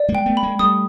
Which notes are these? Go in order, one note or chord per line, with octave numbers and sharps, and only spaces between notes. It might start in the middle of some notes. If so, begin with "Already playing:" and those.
Already playing: D5
G#3 A#3
G5
A3 B3
B5
G#3 A#3
G3 A3 D#6